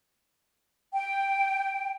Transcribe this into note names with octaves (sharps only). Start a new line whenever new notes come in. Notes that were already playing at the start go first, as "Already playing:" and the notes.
G5